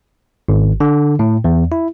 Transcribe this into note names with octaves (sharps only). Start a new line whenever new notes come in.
G#1
D3
A2
E2
E4